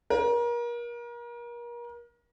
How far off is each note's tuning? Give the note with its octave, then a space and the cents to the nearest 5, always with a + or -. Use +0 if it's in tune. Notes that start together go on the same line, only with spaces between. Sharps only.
A#4 +35